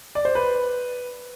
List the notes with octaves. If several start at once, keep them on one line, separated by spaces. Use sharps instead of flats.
D5
C5
B4